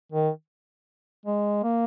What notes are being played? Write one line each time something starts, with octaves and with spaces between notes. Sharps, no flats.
D#3
G#3
A#3